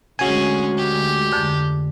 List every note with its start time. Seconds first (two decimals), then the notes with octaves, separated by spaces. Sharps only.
0.19 D2 G#3 C#4 F#4 G#4 G#5
0.77 G4
1.32 F2 D3 G6